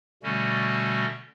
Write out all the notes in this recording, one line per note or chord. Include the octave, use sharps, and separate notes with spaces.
B2 D3 G3 A3 C#4 F#4